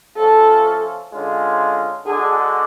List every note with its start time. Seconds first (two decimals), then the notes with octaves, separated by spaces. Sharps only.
0.17 F3 A3 C#4 F4 A4
1.12 D3 G#3 C#4 F4
2.06 D3 G#3 D4 F#4 G#4